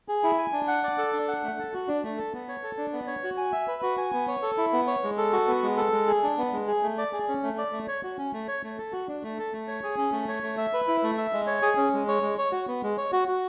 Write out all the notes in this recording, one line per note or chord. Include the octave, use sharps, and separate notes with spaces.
G#4
E4
G#5
D4
F#5
D5
A4
D4
F#5
A3
A4
F#4
D4
A3
A4
B3
C#5
A4
D4
B3
C#5
F#4
G#5
E5
B4
F#4
G#5
B3
C#5
A4
E4
B3
C#5
G#3
A4
F#4
B3
G#3
A4
G#3
G#4
D4
B3
G#3
G#4
A3
D5
G#4
C#4
A3
D5
A3
C#5
F#4
C#4
A3
C#5
A3
A4
F#4
D4
A3
A4
A3
C#5
G#4
C#4
A3
C#5
A3
E5
B4
E4
A3
E5
G#3
C#5
G#4
C#4
G#3
C#5
G#3
C#5
F#4
B3
G#3
C#5
F#4
F#4